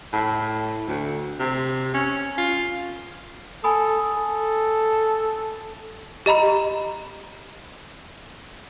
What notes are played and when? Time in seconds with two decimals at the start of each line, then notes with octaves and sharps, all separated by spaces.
0.13 A2
0.88 D2
1.39 C3
1.94 C#4
2.38 F4
3.64 A4 G#5 B5 D#6
4.17 A4
6.26 G4 D#5 A#5 B5